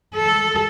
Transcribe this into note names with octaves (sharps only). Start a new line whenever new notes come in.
A4